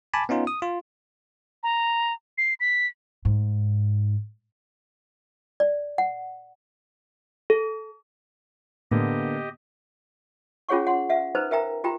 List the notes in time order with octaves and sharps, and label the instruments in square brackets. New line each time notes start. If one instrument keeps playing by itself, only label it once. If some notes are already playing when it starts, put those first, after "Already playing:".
[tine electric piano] G#5 A5 B5 D6
B3 C#4 D#4 F4
D#6
F4
[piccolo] A#5
C7
B6
[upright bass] G#2
[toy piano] D5
F#5
[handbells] A4
[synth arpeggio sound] A2 [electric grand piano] D3 A#3 B3 [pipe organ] G4 D#5
[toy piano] C#4 F4 G#4 C#5 F#5 C#6
F#5 C6
E5 F#5
D#4 A4 B4 C5 A#5
A#4 E5 G5 A#5
F4 G4 G5 A#5